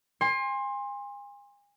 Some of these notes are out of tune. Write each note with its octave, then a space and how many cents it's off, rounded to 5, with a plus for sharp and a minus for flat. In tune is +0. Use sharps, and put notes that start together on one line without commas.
G#5 -35 C6 +20